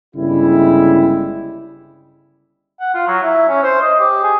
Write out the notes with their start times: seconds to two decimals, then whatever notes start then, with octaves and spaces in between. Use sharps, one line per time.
0.15 G1 C#3 G3 G#3 E4
2.80 F#5
2.94 F4
3.07 F#3
3.23 E4
3.48 C#4
3.63 C5
3.82 D#5
4.00 G4
4.23 G#4